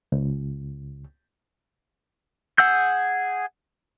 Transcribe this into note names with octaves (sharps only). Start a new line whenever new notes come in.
C#2
G#4 F#5 E6 G6